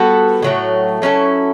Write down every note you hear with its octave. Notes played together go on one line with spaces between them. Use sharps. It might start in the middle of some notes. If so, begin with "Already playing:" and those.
Already playing: G3 B3 F#4 A4
A2 F#3 A3
F#3 C#4 E4 A4